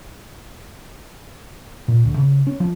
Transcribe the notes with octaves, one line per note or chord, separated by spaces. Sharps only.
A#2
D2
C#3
C#4
F3